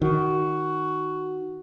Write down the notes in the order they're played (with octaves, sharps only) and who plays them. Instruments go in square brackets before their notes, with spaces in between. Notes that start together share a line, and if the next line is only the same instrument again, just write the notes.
[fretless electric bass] D#3 [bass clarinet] F#4